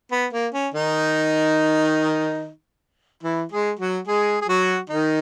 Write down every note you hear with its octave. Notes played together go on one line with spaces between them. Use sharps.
B3
A#3
C#4
D#3 D#4
E3 E4
G#3 G#4
F#3 F#4
G#3 G#4
G#4
F#3 F#4
D#3 D#4